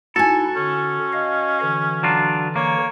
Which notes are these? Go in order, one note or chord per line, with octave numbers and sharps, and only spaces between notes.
D#4 E4 F#4 A4 G#5
D3 C#4
D#5 F5
D3 E3
F#3 D4 F4
A#3 C#5